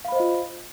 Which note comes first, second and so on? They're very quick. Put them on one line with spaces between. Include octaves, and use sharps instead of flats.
F5 B5 C5 D#5 F4